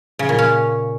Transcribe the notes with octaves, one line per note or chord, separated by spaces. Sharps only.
C#3
A#2
C#4